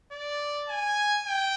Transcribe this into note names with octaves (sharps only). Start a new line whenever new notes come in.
D5
G#5
G5